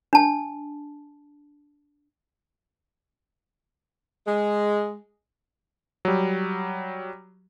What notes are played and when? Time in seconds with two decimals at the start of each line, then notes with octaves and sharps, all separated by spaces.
0.13 D4 A5
4.27 G#3
6.05 F#3 G3